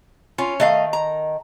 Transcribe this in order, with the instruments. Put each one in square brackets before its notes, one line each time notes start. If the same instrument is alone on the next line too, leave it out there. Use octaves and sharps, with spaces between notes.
[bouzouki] C#4 [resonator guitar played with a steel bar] F4
[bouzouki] D#3 [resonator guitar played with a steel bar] A3 D#5 F5
[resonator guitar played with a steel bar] A#5